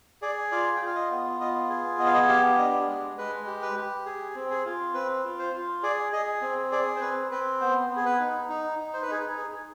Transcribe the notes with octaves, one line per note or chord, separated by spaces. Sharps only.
G#4 D5
F4 D5
F4 G5
F5
D#5
B3
F4 D#5
G#4
B3 D#5
F5
D#5
G4 F5
D4 D#5
G#3
G#3 B4
G4
B4
G4
G#4
C4
G#4
F4
C4 B4
F4
C5
F4
G#4 D5
G#4 D#5
C4
G#4 D5
C5
C4 B4
C4 B4
B3 C5
B3
G#4
B4
D#4
D#4
D#4
C5
B4
D#4 G#4
B4
G#4